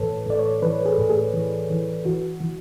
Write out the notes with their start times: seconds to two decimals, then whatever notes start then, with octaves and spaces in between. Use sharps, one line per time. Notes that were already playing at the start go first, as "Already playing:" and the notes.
Already playing: A2 E3 A4 B4 C#5
0.26 A2 D5
0.39 C#5
0.62 E3 B4
0.86 G#4
0.98 A2
1.09 G#4
1.34 E3
1.70 E3
2.05 E3 F#4
2.40 E3